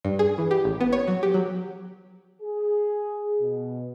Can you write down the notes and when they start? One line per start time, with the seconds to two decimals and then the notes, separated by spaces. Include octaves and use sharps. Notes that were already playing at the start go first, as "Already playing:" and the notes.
0.05 G2
0.19 G#4
0.38 E3
0.51 G4
0.65 A1
0.81 B3
0.93 C#5
1.08 F#3
1.23 G4
1.34 F#3
2.42 G#4
3.40 B2